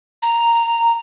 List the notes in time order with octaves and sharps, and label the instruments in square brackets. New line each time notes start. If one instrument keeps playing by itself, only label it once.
[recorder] A#5